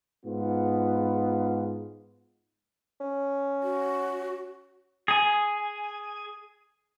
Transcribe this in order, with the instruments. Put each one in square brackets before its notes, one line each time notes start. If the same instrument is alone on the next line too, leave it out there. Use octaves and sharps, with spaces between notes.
[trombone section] G#2 B3 F4
[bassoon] C#4
[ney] F#4
[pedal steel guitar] G#4 G#5